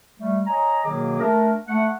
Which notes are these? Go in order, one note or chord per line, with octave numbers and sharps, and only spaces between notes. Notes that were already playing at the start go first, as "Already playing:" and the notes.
G3 A3
C#5 D#5 G#5 A#5
B2 D#3 F#3 A#3 G#4 D6
A3 D4 A#4
A3 F#5